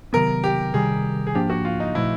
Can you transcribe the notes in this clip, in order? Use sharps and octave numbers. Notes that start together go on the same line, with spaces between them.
C3 D#3 F#3 B3 A#4
G4
C3 D#3 G3 G#4
G#4
G#2 F3 A#3 D4 G4
F#4
F4
D#4
A#2 F3 A3 E4